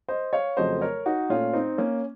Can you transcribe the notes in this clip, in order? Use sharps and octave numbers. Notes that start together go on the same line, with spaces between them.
C5 D#5
C#5 F5
F2 C#3 F#3 A3 C5 D#5
A#4 C#5
D#4 F#4
A#2 A3 C#4 F4
C4 D#4
A#3 C#4